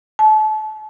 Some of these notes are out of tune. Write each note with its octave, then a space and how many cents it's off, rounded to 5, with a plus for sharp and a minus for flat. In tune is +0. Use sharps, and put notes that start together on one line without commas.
A5 -35